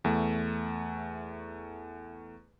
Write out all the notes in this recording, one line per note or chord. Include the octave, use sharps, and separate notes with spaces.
E2 A3